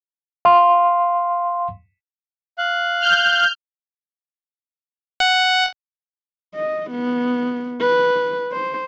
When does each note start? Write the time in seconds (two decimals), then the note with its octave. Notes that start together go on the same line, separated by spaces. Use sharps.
0.45 F5 C6
2.58 F5 F#6
3.00 F6 G6
5.20 F#5
6.55 D#5
6.91 B3
7.80 B4
8.52 C5